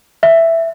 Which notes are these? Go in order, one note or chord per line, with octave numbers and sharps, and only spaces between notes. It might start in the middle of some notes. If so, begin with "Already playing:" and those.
E5